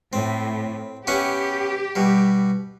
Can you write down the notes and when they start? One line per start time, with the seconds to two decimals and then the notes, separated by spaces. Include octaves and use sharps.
0.13 A2 C4
1.07 B3 C#4 E4 G4
1.96 B2 G3